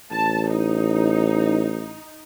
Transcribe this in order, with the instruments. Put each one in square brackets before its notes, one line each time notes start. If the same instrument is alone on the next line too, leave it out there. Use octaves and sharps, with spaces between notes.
[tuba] A1 [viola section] A5
[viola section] D#4